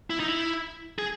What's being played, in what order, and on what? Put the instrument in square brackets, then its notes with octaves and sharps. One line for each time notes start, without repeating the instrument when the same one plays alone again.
[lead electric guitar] E4
D#4
E4
G#4